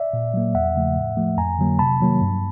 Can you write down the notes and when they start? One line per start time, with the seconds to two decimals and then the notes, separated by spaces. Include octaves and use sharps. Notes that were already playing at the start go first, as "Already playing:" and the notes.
Already playing: D5 E5
0.13 A#2
0.34 F#3 A#3
0.55 E2 E5 F#5
0.75 C#3 F3 A3
0.97 A2
1.17 F3 A3
1.37 F2 G#5 A#5
1.59 D3 F#3 A#3
1.79 C3 A5 B5
2.01 D#3 F#3 A#3
2.21 G2